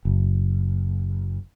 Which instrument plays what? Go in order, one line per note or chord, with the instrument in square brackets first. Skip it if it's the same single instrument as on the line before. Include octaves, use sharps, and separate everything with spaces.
[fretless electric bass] F#1